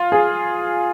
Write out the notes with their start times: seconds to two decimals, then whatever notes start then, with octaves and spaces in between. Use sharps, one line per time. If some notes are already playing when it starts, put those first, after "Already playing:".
Already playing: F4
0.12 G#4